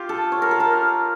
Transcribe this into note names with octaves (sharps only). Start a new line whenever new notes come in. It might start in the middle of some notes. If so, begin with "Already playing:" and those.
Already playing: F4 G4
A4
C#5
A#4
A4
A#4